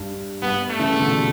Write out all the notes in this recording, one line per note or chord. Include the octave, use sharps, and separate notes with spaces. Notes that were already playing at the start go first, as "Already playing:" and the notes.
Already playing: G2
G2 B3
A3
C#3 E3
B2 D3